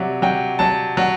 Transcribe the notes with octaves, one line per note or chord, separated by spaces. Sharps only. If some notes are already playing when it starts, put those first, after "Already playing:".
Already playing: C3 F#3 D5 E5
F#3 G5
F#3 A5
F#3